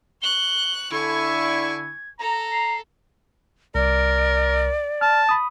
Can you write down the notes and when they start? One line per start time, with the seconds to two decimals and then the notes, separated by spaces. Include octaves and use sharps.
0.22 C#6 F#6 G7
0.91 D3 E4 G#5 C#6 G#6
2.19 A4 A#5
2.51 C7
3.75 C2 A#4 D5
5.01 A5 F6
5.29 B5 D#6